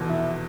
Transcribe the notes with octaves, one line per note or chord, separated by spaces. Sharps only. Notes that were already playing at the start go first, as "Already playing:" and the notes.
Already playing: F1 E2 B2
E4